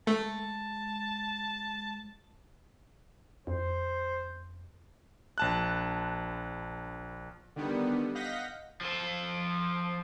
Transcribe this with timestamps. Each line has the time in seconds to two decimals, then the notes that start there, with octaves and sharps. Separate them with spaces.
0.07 G#3 A3 A5
3.47 F2 C5
5.38 A#1 A5 F#6
7.56 D3 D#3 G3 B3
8.15 D#5 F5 F#5 G6 A#6 B6
8.81 F3 A4